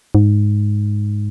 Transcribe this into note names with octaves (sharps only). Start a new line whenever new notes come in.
G#2